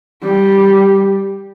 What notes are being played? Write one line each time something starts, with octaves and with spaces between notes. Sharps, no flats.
G3